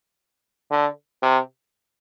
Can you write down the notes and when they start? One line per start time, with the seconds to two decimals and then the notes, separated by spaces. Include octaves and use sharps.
0.71 D3
1.22 C3